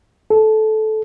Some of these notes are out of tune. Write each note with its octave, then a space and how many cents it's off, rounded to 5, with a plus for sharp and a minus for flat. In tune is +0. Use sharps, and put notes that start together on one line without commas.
A4 -15